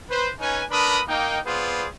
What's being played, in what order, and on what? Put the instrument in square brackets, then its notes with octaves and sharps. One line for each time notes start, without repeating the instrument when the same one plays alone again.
[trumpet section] B4 C5
C#4 D#4 B4 G#5
D4 A#4 B4 B5 D#6
A#3 D#4 G5
B3 F4 G#4 B4 C5 D5